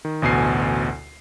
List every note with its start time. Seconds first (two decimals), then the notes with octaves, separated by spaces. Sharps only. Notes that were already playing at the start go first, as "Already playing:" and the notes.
0.05 D#3
0.22 A1 D2 B2 G#5 C7